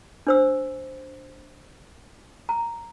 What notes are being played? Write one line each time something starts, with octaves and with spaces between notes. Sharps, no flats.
D4 C5 E6
A#5